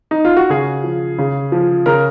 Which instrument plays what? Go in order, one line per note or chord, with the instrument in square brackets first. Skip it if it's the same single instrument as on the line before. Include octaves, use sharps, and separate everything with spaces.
[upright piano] D#4
F4
F#4
C#3 G#4
F3
C#3
F3
C#3 A#4